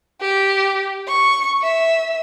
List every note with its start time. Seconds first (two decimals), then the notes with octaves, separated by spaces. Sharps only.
0.21 G4
1.08 C#6
1.62 E5